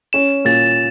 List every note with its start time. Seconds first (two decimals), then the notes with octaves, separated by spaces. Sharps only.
0.13 C#4 E7
0.45 A#2 A6